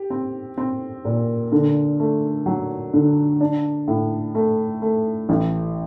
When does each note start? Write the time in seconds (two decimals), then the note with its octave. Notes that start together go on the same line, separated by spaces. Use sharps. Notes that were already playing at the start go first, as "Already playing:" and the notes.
Already playing: G4
0.10 C4
0.58 C4
1.05 A#2
1.52 D3
2.00 A3
2.46 F#3
2.94 D3
3.41 D4
3.88 A2
4.35 A3
4.82 A3
5.29 A1